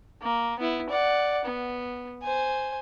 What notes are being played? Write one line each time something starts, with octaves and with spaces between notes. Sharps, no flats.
A#3
B3 E4
D5 F#5
B3
C5 G#5